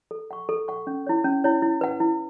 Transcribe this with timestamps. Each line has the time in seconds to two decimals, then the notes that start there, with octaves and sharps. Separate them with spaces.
0.11 A4
0.31 F#5 C#6
0.49 A4
0.68 F#5 C#6
0.87 C#4
1.07 E4 C#5
1.24 C#4
1.44 E4 C#5
1.62 E4
1.81 B4 F#5
2.00 E4